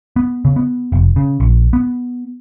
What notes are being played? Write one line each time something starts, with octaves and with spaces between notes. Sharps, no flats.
B3
C#3
B3
F1
C#3
A#1
B3